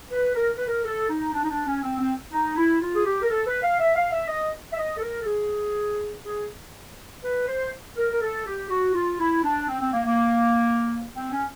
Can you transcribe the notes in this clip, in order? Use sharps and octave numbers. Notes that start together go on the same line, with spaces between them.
B4
A#4
B4
A#4
A4
D#4
D4
D#4
D4
C#4
C4
C4
D#4
E4
F4
G#4
G4
A#4
A4
B4
F5
E5
F5
E5
D#5
E5
D#5
A4
A#4
A4
G#4
G#4
B4
C5
A#4
A#4
A4
G4
F#4
F4
E4
D4
C4
C4
A#3
A#3
C4
C#4